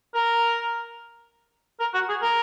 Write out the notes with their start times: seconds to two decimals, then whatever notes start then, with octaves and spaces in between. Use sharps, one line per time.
0.14 A#4
1.80 A#4
1.94 F#4
2.09 G#4
2.22 A#4